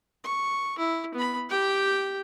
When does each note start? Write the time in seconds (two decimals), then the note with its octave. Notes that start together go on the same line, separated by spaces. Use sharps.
0.24 C#6
0.78 E4
1.14 B3 B5
1.49 G4 G5